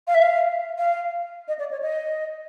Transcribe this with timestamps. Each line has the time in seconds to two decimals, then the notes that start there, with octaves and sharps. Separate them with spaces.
0.07 F5
0.14 E5
0.22 F5
0.78 F5
1.48 D#5
1.59 D5
1.71 C#5
1.82 D#5